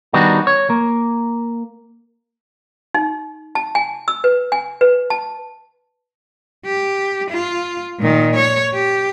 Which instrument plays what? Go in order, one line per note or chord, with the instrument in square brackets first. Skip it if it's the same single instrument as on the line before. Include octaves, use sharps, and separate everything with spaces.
[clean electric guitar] D#3 G3 B3 D4 D#4 F#4
C#5
A#3
[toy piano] D#4
A5
G#5
E6
B4
G#5
B4
A5
[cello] G4
F4
A#2 D#3
C#5
G4